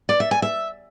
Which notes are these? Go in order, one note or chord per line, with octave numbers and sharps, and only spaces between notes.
D5
E5
G#5
E5